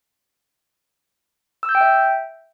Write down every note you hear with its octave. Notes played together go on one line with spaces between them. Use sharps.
E6
G6
G5
E5